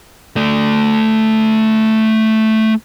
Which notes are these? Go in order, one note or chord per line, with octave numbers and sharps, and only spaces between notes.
A3 D5